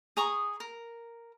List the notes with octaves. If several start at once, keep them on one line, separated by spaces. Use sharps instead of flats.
G#4 A#5 C#6 D#6
A#4